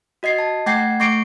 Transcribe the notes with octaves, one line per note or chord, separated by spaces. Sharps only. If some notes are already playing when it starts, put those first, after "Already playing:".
F#4 D#5 G#6 C7
A5
A3 F#5 G5 G#6 C7
A3 C#6 C7 D7